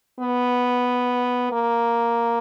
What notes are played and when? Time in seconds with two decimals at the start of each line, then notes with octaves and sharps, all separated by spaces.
0.20 B3
1.52 A#3